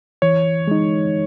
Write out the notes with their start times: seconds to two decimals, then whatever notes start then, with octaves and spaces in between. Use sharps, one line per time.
0.22 E3 C#5
0.68 G#3 D#4